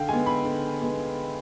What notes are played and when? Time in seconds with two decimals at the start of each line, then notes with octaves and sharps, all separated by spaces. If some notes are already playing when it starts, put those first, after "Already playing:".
Already playing: D3 F5 G5
0.09 G#3 B3 G#5
0.26 B5
0.45 D3
0.82 G#3 B3